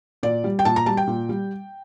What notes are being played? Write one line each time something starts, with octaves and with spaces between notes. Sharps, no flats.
A#2 D5
G3
G5
A#2 A5
A#5
G3 A5
G5
A#2
G3